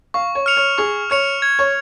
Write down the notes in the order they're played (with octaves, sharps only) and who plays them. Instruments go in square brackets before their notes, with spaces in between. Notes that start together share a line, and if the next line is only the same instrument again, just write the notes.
[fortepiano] F5 [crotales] C#6
[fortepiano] C#5
[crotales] F6 C#7 F7
[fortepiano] C#5
[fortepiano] G#4 [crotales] C#6
[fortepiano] C#5 [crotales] F6 C#7 F7
[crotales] G#6
[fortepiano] C#5